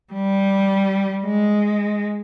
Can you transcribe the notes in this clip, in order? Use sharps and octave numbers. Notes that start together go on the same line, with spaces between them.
G3
G#3